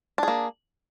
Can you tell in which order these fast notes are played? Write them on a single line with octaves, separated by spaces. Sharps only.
D4 G#4 A#3